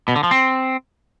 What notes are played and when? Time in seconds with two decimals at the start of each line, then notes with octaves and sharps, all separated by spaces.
0.08 B2
0.16 D3
0.23 F3
0.31 C4